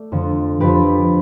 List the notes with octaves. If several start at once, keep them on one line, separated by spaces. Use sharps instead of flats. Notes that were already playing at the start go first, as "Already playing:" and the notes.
Already playing: A3 D5
F2 D3 F3
F2 D3 F3 G4 B4